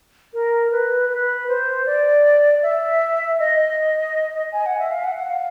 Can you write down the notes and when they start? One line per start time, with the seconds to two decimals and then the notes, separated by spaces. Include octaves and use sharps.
0.34 A#4
0.72 B4
1.10 B4
1.48 C5
1.86 D5
2.63 E5
3.39 D#5
4.53 G#5
4.66 F#5
4.79 E5
4.91 F5
5.04 F#5
5.17 F#5
5.30 F5